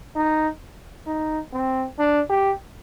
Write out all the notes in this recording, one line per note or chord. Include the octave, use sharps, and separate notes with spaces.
D#4
D#4
C4
D4
G4